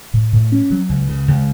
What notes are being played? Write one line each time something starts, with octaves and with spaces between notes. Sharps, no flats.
A2
A2
C#4
F#3
C#2
C#3
C#2